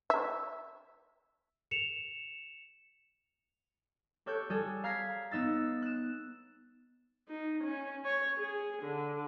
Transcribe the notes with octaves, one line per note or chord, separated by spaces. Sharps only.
E5
C#7 E7 F7
G4 A4 C#5 F#6 G6
G3 G#4 A4
F5 A#5 G#6 B6 C7
B3 D#4 E6 A6
F#6 E7
D#4
C#4
C#5
G#4
D3